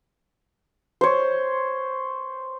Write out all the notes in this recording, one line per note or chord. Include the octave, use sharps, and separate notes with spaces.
C5 C#5